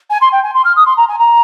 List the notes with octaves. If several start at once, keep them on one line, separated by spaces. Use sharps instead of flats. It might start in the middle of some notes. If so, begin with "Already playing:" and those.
G#5
C6
G5
G#5
C6
F6
D#6
C6
A#5
G#5
A#5